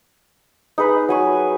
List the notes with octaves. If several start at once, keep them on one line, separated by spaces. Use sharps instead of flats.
D#4 G#4 B4
F#3 G#5 C#6